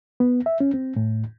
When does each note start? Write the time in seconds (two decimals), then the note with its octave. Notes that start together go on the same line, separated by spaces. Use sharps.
0.20 B3
0.46 E5
0.60 C#4
0.74 C4
0.96 A2